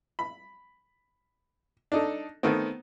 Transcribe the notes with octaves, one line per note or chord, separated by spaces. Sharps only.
B5
D4 D#4 A4
D#3 A3 B3 C4